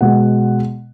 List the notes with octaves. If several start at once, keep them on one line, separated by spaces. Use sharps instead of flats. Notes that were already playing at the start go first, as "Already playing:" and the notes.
B2 G#3 F#5